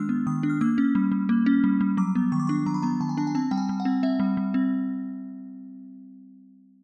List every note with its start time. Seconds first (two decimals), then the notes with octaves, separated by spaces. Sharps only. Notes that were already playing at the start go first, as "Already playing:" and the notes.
Already playing: D#3 G#3 D4 E6 F6
0.09 B3
0.27 D#3 D#6
0.43 D4
0.50 F6
0.61 A#3 E6
0.78 C#4
0.95 G3
1.12 G3
1.29 A#3
1.46 C#4
1.64 G3
1.81 G3
1.97 F#3 D6
2.15 B3
2.32 D#3 C#6
2.40 D6
2.47 D4 C#6
2.66 F#3 A#5
2.74 B5
2.82 B3 A#5
3.00 D#3 A5
3.09 G#5
3.17 D4 A5
3.27 G#5
3.35 C4 A5
3.51 G3 G5
3.57 G#5
3.69 G3
3.80 F#5
3.85 C4
4.03 C4 E5
4.20 G3
4.37 G3
4.54 C4